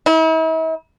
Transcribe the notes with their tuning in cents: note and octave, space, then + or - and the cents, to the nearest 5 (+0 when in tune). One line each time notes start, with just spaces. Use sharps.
E4 -45